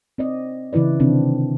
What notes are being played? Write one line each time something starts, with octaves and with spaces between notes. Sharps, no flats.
C4 D5 D#5
C#3 E3 E4 B4 D5
C3 D#3 C4 D4